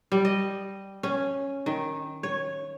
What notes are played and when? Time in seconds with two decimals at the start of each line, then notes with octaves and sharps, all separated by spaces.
0.12 G3
0.25 D#5
1.03 C#4
1.66 D#3
2.23 C#5